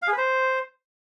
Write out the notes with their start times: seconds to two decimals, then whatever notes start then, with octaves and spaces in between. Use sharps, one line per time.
0.02 F5
0.07 G#4
0.12 B4
0.17 C5